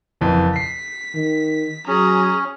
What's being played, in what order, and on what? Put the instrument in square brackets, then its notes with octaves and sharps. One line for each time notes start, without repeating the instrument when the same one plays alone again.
[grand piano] F#1 F2 E3
[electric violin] B6 [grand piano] C7
[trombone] D#3
[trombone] F#3 [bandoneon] C#4 [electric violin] G#4 A#5